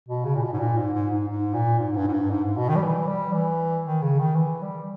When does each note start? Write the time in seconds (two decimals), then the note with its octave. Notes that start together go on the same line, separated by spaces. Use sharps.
0.08 B2
0.25 C#3
0.36 A#2
0.43 B2
0.53 G#2
0.60 A#2
0.77 G#2
0.93 G#2
1.10 G#2
1.28 G#2
1.54 A#2
1.79 G#2
1.93 G#2
1.97 G2
2.08 G#2
2.13 G2
2.30 G#2
2.44 G#2
2.57 B2
2.69 D#3
2.76 G3
2.83 E3
3.07 G3
3.33 E3
3.85 D#3
4.02 C#3
4.19 D#3
4.36 E3
4.62 G3